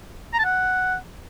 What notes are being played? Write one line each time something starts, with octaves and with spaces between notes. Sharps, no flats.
A#5
A5
F#5